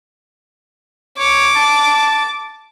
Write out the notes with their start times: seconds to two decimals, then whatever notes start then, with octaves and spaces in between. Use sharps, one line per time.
1.19 C#5 D6
1.56 A5